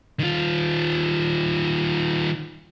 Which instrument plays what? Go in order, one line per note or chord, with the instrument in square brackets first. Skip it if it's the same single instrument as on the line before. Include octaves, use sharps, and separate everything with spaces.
[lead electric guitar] D#3 F4